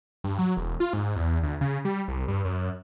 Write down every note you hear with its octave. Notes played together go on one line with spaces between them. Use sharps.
G2
F#3
E1
F4
G#2
E2
D2
C#3
G3
C2
G2
F#2